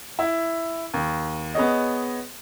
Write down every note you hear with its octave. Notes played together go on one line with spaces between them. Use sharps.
E4
D#2
B3 G#4 C#5 D#5